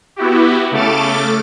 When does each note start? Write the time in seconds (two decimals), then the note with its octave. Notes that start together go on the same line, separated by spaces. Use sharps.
0.16 B3 E4 F#4 G4
0.71 C#3 A3 A4 D6 F6 A6